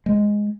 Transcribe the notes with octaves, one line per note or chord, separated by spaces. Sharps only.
G#3